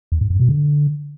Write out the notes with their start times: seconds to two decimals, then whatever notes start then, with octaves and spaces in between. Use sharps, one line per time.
0.12 E2
0.21 G#2
0.30 F#2
0.40 B2
0.49 D3